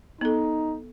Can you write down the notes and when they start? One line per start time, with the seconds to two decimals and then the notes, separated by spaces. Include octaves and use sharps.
0.21 B3 D#4 A4